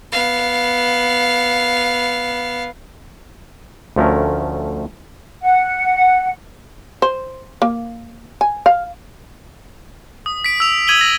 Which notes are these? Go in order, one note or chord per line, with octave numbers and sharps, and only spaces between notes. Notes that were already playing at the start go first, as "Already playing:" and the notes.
B3 F5
D2 F3 A3 C#4 A#4
F#5
C5
A#3
G#5
F5
D#6
B6 D7
E6 F7
D#6 G#6 D#7 F#7 G7
A#6